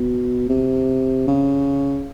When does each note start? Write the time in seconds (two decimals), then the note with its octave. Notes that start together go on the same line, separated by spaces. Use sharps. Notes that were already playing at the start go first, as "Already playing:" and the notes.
Already playing: B2
0.49 C3
1.27 C#3